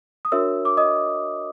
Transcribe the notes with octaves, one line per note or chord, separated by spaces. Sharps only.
D#6
D4 F#4 A#4 C#5 E5 E6
D6
D#5 D#6